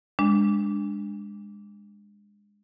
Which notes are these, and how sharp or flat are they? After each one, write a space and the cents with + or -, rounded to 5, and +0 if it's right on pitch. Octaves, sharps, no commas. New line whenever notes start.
G#3 -20 D4 +0